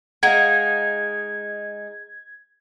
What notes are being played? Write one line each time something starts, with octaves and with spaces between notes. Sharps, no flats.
G#3 D#4 F5 F#5 G#6